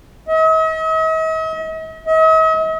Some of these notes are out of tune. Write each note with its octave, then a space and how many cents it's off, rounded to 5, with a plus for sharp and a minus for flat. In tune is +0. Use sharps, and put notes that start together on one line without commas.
D#5 +45
D#5 +45